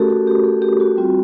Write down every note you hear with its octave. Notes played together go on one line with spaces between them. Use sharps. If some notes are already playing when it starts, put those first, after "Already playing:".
Already playing: A3 C#4 F#4 G4 A4 A#4
F#4
G4
G#4
G4
F#4
G3 C4 F4